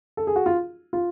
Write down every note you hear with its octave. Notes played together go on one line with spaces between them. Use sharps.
A4
G#4
F#4
F4
F4